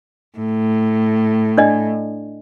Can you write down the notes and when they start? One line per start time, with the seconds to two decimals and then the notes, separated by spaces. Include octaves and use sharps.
0.38 A2
1.58 D4 D5 D#5